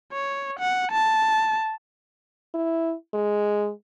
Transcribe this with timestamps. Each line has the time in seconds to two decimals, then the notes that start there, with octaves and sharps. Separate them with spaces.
0.12 C#5
0.59 F#5
0.91 A5
2.54 E4
3.14 G#3